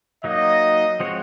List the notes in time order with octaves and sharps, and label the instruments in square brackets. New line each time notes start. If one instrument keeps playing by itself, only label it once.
[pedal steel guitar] F#3 A#3 D#4 [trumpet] D#5
[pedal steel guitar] F3 G#3 C4 F#4 C#5